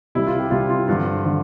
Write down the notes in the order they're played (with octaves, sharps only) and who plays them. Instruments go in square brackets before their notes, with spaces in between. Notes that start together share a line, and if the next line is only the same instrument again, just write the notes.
[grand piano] C2 C3 G3 E4
F4
G4
C2 C3 G3 F4
F4
G2 D3 F3 F4
D3 F3